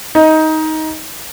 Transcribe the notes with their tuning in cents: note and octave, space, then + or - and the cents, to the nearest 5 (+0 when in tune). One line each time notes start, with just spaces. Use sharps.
D#4 +15